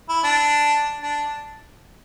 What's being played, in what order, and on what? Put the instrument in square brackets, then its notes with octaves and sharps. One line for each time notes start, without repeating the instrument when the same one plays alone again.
[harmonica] E4
D4
D4